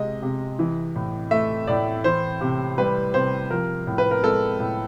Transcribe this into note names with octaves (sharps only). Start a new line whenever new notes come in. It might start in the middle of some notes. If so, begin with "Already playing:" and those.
Already playing: C3 G#3 D#5
C3
E3
A2
A3 E5
A2 D5
E3 C5
C3
G3 B4
C3 C5
F3 A#4
A2
B4
A#4
G#3 A4
A2